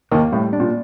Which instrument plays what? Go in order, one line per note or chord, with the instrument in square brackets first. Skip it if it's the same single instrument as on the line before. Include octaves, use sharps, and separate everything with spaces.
[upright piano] D#2 D#3 [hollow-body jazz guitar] A#3
[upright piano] A2 [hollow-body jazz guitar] G3
[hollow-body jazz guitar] D4
[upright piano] A#2